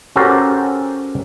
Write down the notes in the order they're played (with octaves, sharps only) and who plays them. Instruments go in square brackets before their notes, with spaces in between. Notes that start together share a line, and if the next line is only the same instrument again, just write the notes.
[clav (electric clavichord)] C#4 F#4 G4 A4 A#4 C5